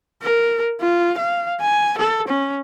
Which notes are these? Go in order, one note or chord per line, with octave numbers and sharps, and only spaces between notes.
A#4
F4
F5
G#5
A4
C#4